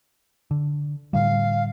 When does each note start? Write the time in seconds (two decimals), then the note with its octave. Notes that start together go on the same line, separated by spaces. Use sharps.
0.51 D3
1.13 A2 D3 G3 F5